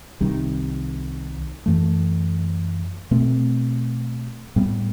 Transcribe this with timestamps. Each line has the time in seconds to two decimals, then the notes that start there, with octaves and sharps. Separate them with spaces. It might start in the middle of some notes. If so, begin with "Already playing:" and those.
0.21 C2 C3 D#3 G3
1.66 F#2 E3 A3
3.11 B2 A3 C4
4.56 A2 G3 B3